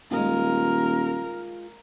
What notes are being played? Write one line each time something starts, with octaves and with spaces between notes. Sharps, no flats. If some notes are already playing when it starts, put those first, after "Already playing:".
D#1 G#3 F4 A#4